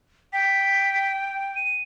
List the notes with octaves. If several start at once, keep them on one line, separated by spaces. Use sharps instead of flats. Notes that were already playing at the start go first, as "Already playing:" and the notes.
G5 B6
D#7